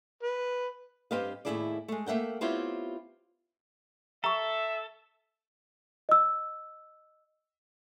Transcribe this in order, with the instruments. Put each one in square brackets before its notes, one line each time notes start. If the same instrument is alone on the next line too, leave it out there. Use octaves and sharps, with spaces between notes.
[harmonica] B4
[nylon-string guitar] G2 C4 G4 B4 D#5 F5
D#2 A2 F#3 E4 G#4 D5
G#3 A3
A3 A#3 E5 F#5 G5
B3 C4 E4 F4 G4 C#5
[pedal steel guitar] A4 [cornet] E5 [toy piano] A#5 C#6
[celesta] D#5 E6